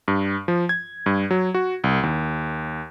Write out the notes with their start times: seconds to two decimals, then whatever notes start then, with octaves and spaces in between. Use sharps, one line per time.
0.08 G2
0.48 F3
0.69 G#6
1.06 G2
1.31 F#3
1.54 F#4
1.84 C2
2.03 D#2